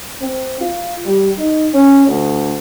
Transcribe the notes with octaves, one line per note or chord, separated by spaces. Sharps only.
C4
F4
G3
D#4
C#4
D2